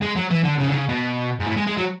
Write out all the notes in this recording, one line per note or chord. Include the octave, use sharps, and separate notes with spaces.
G#3
F#3
E3
D3
C#3
D3
C#3
B2
G#2
A2
G#3
G#3
F#3